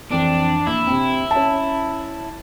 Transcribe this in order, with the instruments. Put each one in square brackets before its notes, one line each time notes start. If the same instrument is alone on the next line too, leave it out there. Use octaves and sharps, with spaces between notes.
[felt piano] F2 E3 C4 [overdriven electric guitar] D4
[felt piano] A#1 [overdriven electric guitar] E4
[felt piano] C3 C4
C#4 A5